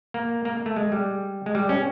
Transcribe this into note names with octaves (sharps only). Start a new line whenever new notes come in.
A#3
A#3
A3
G#3
G3
G#3
G3
C#4